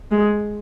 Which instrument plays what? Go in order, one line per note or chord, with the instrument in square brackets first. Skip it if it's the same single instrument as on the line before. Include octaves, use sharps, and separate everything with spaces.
[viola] G#3